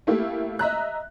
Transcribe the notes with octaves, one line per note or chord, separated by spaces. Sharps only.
A3 A#3 E4 G4 A4
D#5 E5 A#5 F#6